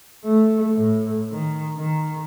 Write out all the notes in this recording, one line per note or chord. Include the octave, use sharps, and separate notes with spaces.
A3
A2
D#3
D#3